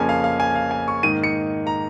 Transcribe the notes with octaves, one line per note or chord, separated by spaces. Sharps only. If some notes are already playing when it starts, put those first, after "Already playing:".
Already playing: F2 C#3 F3 A#3 C#4 G#5
F5
F5
G#5
F5
G#5
C#6
G#2 D#3 A#3 D#7
C#7
A#5